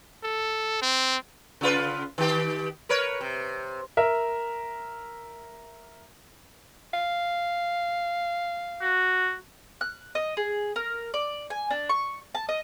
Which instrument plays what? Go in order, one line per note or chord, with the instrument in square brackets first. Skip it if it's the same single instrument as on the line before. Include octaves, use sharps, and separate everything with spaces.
[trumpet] A4
C4
[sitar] C#3 F4 B4
D#3 G4
A#4 B4 C#5
C3
[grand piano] A#4 E5
[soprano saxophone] F5
[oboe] F#4
[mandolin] F#6
D#5
G#4
A#4
D5
G#5
D4
C#6
A5
D#5